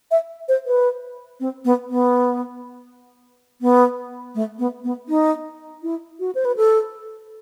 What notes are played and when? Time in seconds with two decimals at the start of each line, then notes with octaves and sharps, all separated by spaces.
0.11 E5
0.48 C5
0.66 B4
1.40 C4
1.65 B3
1.89 B3
3.61 B3
4.35 A3
4.59 B3
4.84 B3
5.09 D#4
5.83 E4
6.20 F#4
6.35 C5
6.45 B4
6.56 A4